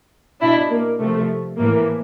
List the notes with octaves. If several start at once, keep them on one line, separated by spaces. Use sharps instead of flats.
B2 D4 E4
A#3
C3 F3 A3
A2 E3 A#3